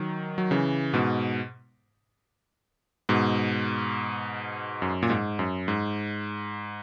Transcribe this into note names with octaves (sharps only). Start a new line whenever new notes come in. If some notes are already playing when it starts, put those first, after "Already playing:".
Already playing: D#3 F#3
F#3
C#3 E3
G#2 B2
G#2 B2
F#2
A#2
G#2
F#2
G#2